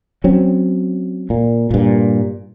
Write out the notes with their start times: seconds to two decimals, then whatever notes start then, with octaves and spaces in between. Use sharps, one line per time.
0.24 F#3 C4 C#4
1.30 A#2
1.71 G2 A#2